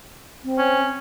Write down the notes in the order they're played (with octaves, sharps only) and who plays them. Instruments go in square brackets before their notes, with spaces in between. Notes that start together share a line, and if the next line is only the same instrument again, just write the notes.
[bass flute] C4
[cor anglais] C#4